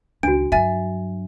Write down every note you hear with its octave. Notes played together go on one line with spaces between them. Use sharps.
C#2 D#3 D4 F#4 D7
G2 F#3 E5 G#5 A6